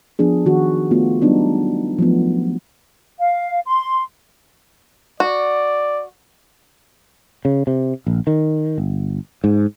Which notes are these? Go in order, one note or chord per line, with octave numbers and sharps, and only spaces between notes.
F3 B3 D4 G#4
D#3 F#4
A3 B3 F4 F#4
F#3 G3 B3 D4 D#4
F3 F#3 A3 B3
F5
C6
F#4 D5
C#3
C3
A#1
D#3
G1
G#2